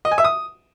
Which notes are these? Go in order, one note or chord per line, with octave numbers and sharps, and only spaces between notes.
D#5
G#5
E5
D#6